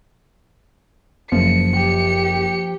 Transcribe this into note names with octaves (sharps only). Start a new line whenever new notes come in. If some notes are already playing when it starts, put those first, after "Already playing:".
F#1 F3 C#7
G4